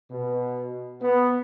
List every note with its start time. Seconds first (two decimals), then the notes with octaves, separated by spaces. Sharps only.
0.11 B2
1.02 B3